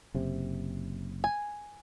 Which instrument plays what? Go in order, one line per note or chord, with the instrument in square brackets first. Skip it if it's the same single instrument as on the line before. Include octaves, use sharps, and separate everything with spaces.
[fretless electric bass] F#1 C3
[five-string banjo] G#5